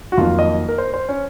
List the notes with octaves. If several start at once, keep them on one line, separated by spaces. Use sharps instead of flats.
F#4
F2 D#3 F#3 A#3 F4
D#5
A#4
C5
C5
C#4